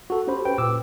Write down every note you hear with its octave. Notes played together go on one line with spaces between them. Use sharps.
F#4 A4
C#4 G4 C5 B5
B4 G5
A#2 D6 E6